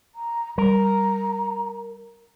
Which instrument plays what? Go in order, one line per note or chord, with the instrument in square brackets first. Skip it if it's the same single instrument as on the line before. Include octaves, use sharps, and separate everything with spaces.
[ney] A#5
[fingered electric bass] G3 [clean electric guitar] A#4 [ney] A#5